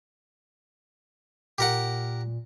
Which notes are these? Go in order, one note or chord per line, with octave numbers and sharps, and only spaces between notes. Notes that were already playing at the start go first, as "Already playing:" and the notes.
A#2 G4 A#4 F#5